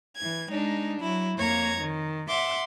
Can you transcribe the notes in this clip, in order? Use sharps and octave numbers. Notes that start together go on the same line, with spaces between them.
E3 G#6
G#3 D4 D#4
F#3 E4
F2 A#3 C#5 A#5 G#6
D#3
E5 F#5 C6 D6